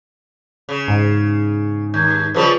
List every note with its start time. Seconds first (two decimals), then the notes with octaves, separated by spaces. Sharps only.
0.69 C#3
0.88 G#2
1.94 D#2 G6 G#6
2.34 C#3 F3 G3 F4 G#4 B4